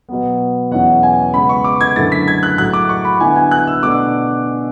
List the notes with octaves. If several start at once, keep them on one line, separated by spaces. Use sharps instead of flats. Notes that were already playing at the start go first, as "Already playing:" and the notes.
B2 F#3 B3
E2 B2 F#3 C#4 E4 F#5
G#5
C#3 G#3 B3 B5
C#6
D6
G#6
F#2 D3 A3 E4 A6
B6
G#6
F#6
A2 F#3 A3 F#6
D6
C#6
B5
D3 F#3 B3 E4 G#5
G#5
F#6
E6
B2 A3 D4 D6